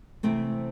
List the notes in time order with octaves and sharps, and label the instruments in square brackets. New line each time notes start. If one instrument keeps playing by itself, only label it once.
[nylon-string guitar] C3 E3 A3 C4 G5